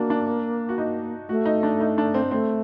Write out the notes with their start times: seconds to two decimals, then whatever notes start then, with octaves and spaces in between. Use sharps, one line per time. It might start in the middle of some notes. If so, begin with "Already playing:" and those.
Already playing: A#3 D4 F#4
0.10 D4
0.69 F#4
0.78 D#4
1.29 A3 F#4
1.46 D#4
1.63 D4
1.81 D#4
1.98 D4
2.14 C4
2.31 A3 C4